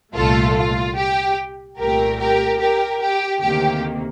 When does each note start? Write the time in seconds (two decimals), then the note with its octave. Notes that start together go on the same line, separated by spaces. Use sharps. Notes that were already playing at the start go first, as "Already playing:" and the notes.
0.15 C2 A#2 A3 F4 A4
0.56 F4
0.97 G4
1.78 C2 A#2 A3 G4 A#4
2.19 G4 A#4
2.60 G4 A#4
3.01 G4
3.41 D2 C3 D#3 A#3 G4